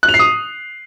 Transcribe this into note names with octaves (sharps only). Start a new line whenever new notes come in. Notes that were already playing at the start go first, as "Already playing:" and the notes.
F#6
F7
C7
D#6